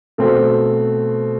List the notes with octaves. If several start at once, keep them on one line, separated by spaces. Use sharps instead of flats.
B2 A3 C4